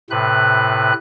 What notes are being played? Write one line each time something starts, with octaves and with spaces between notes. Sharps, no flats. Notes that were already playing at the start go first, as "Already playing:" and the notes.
A2 C3 B4 F#6